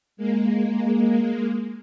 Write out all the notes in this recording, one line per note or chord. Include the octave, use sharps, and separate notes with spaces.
G#3 A#3